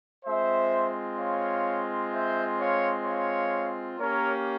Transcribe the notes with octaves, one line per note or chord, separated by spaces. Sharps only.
G#3 C4 F4 C5 E5
C#5 F5
C5 E5
C#5 F5
C#5 F5
A#3 C#4 G4 A#4 C#5